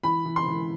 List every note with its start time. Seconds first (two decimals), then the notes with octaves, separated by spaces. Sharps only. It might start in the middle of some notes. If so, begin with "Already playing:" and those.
0.03 E3 B5
0.25 E3
0.36 C6
0.48 E3